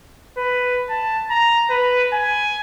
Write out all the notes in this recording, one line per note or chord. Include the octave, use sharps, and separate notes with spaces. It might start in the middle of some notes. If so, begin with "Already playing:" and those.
B4
A5
A#5
B4
G#5